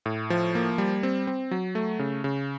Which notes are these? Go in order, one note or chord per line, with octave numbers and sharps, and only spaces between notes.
A2
F3
A#3
G3
C4
C4
F#3
A3
C#3
C#3